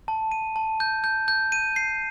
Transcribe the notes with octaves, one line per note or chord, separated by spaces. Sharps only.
A5
D#7
A5
G6
G6
G6
D#7
C7